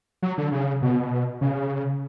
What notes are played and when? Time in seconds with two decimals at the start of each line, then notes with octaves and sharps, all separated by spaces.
0.22 F#3
0.38 D3
0.52 C#3
0.82 B2
1.41 C#3